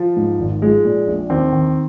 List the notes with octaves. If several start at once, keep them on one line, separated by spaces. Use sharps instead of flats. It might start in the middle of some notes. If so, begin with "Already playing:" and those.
Already playing: F3
G#2
G#1
F3 G#3
A#2
A#1
D#2 C4
D#3